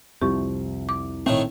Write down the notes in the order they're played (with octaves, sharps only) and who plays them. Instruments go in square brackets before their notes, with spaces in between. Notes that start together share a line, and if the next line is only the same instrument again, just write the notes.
[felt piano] C2 [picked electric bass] F2 C3 F3 [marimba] G4 C#6
[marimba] D6
[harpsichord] A2 D#3 A3 [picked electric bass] C4